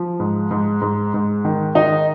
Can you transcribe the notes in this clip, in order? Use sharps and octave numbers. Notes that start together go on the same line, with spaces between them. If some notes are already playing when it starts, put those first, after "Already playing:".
Already playing: F3
G#2
G#2
G#2
G#2
D#3
D#3 D#4